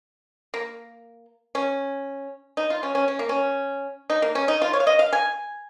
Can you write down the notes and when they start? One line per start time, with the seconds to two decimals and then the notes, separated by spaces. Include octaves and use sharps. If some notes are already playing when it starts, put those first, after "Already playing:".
0.54 A#3
1.55 C#4
2.57 D#4
2.70 F4
2.83 C#4
2.95 C#4
3.08 C#4
3.19 A#3
3.29 C#4
4.10 D#4
4.22 A#3
4.35 C#4
4.48 D#4
4.62 F4
4.73 C#5
4.80 F5
4.87 D#5
4.99 F5
5.13 G#5